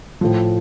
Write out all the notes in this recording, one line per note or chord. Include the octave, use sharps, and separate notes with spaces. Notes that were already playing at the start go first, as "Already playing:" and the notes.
A2 F3